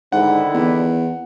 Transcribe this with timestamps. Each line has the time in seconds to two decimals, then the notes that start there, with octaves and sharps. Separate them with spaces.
0.12 G#2 D3 D#3 E4 F#5
0.54 E2